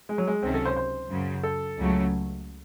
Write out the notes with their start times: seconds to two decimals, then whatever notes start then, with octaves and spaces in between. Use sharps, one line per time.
0.09 G#3
0.18 F#3
0.27 G#3
0.42 C#2 C3 D#3 F#3 C4 C#4
0.54 A4
0.65 C5
0.77 C5
1.10 F#2 C#3 F#3
1.43 A4
1.77 C#2 C#3 F#3 A3